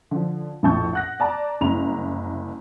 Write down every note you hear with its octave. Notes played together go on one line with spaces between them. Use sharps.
D3 F3
A#1 F2 A2 A5 C#6 G6
F#5 F#6 A#6
D5 A5 A#5
F#1 C2 E4 A#5 F7